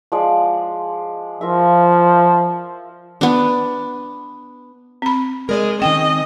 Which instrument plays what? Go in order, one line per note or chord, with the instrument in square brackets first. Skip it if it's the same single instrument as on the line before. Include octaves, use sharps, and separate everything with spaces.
[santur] F3 G#3 D5
[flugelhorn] F3 [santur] F4 A#4 E5
[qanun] B3 D4
[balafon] C4 B5
[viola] G#3 [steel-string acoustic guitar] A#4 D5 D#5
[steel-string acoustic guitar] D#3 C4 C#4 [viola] D#5 [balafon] G5